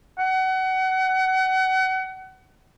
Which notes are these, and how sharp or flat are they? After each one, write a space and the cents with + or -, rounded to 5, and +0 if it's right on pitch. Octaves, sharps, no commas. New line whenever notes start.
F#5 +30